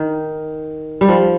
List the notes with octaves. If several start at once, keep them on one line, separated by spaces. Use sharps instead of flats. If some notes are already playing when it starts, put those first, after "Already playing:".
Already playing: D#3
G3
F3